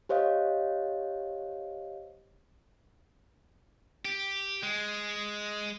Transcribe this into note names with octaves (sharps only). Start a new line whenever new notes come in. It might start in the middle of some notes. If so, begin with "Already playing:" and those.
G4 C5 C#5 D#5 F5
G4
G#3